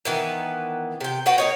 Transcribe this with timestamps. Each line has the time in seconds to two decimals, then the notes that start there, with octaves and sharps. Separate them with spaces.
0.05 D#3 E3 B3
1.01 C3 G5
1.26 F#4 B4 F#5 G5
1.38 A#3 D#4 C#5